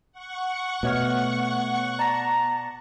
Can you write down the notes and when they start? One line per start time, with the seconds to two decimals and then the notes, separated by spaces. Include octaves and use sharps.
0.12 F#5 C#6
0.83 B2 A3 C#5 F6
1.99 D5 A5 A#5 A#6